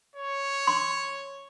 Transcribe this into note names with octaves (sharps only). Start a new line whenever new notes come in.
C#5
C6